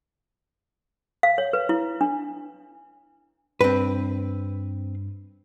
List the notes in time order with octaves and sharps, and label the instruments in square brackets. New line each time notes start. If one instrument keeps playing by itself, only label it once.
[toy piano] F5
C#5
B4
E4
D4
[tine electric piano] G2 [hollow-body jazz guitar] C4 B4